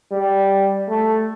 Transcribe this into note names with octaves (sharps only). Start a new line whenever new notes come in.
G3
A3